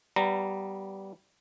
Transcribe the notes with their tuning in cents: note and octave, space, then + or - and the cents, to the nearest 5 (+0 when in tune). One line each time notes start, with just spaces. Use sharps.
G3 -15 B3 +0 A#5 -15